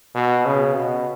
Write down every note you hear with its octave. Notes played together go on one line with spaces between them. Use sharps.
B2
C#3
B2